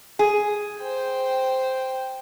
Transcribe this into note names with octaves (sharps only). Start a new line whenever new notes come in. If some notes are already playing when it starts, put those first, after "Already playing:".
G#4
C5 G5